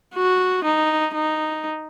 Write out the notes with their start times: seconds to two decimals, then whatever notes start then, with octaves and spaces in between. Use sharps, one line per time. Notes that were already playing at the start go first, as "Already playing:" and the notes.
0.14 F#4
0.64 D#4
1.14 D#4